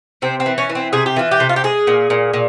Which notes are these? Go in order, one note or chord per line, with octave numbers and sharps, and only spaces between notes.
C3 C4
C4
E3
C#4
E3
C4
C3 G#4
G4
E3 F4
G4
C3
F4
G4
G#3 G#4
A#2
A#2
A#2